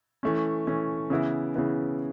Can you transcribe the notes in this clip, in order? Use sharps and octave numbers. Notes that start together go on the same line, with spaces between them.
E3 A3 C#4
E3 A3 C#4
C#3 E3 B3 E4
C#3 E3 B3 E4